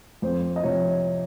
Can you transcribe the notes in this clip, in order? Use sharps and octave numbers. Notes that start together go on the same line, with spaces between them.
F2 C5
D#5
C3 F3 C#5